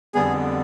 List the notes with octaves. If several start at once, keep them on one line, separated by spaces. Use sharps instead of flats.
F2 D3 G3 B3 G#4